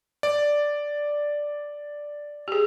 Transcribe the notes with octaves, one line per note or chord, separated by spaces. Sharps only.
D5
G4 G#4